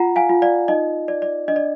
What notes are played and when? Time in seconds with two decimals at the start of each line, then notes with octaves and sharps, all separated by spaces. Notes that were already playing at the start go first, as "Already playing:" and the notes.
Already playing: F4 F#5 A#5
0.16 F5 G#5
0.29 F4
0.42 D5 F5
0.68 D#4 D#5
1.08 D5
1.22 D5
1.48 D4 D#5
1.56 D5